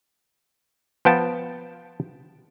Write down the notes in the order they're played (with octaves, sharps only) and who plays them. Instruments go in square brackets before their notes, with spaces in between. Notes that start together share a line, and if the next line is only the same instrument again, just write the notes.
[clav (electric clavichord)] F3 B3 G5 A5